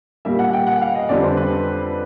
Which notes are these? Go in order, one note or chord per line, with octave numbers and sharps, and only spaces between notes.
A#2 G3 A#3 E5
F#5
G5
F#5
F5
D#5
F2 D3 G3 C4 D5
C5
B4